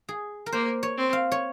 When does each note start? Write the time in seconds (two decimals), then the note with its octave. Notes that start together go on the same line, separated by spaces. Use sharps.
0.09 G#4
0.46 A#4
0.52 A#3 C5
0.83 C#5
0.98 C4
1.13 F5
1.32 C#5